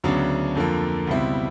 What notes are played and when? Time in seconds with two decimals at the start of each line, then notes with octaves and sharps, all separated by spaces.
0.04 D2 C#3 F#3 B3 D4
0.55 F2 D3 F3 A#3
1.07 C#2 B2 G3 C4 E4